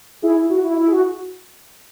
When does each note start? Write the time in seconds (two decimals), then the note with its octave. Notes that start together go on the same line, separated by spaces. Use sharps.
0.22 E4 G#4
0.36 E4
0.50 F#4
0.64 E4
0.78 E4
0.87 G#4
0.92 F#4